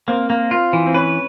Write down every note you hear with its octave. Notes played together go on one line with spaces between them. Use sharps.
A#3 C4
A#3
F4
E3
C4
C#4 B4